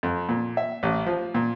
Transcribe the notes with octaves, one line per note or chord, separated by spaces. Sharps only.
F2
A#2
E5
A1
F3
A#2